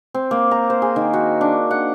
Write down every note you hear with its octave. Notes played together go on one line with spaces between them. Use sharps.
C4
A#3
A#5
C5
G#4
D#3
F#4
D4
F#5